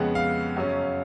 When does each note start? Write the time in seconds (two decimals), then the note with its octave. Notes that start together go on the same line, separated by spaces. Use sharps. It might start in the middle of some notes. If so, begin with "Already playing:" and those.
Already playing: F2 C#3 G#3 B3 F#5
0.15 F5
0.57 F#2 C#3 F#3 C#4